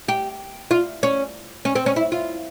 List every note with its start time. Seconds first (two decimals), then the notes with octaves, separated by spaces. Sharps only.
0.08 G4
0.71 F4
1.03 C#4
1.65 C#4
1.75 C4
1.86 C#4
1.96 E4
2.12 F4